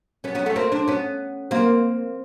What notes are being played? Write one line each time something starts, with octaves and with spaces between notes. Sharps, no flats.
B3 C#4
B3 C#4
A3 B3
A#3 C4
C4 D4
B3 C#4
A#3 C4